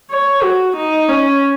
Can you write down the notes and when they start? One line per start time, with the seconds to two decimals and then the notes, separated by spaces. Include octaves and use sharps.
0.11 C#5
0.43 F#4
0.77 D#4
1.09 C#4